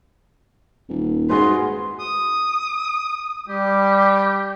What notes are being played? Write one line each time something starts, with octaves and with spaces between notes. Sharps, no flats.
D#1
G#2 F#4 G#4 B4 C6
D#6
G3 G4